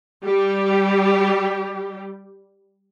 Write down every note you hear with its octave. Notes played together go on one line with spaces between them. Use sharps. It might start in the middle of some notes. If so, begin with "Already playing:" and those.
G3 G4